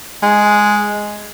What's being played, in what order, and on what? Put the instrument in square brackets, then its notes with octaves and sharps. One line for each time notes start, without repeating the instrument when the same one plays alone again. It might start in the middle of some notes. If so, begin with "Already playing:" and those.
[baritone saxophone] G#3